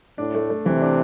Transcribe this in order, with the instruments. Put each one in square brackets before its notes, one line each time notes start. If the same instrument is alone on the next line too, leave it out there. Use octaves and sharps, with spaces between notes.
[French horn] A2 [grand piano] D4
[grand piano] A3
A3
[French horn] C3 [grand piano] E3
[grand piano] D4